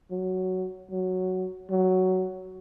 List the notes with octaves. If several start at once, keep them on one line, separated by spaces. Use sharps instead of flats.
F#3
F#3
F#3